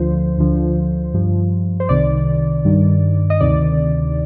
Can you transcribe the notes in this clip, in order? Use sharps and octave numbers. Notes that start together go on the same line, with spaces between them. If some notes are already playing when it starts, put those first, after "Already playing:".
Already playing: D2 D3 F3 C5
D2 D3 F3
G2 F3
C5
C2 C3 D#3 D5
G2 D#3
D#5
D2 C3 D#3 D5